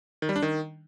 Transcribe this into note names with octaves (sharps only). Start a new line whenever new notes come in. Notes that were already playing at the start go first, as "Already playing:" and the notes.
D#3
G3
D4
D#3